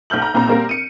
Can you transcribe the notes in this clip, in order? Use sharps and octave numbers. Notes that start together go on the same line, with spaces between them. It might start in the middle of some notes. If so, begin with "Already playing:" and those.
B1 F6 G6 F#7
A#5
B1 A#2 C4 A#5
G3 A#3 C4 G4 A#4
C#7 D#7